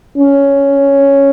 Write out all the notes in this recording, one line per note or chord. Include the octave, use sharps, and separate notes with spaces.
C#4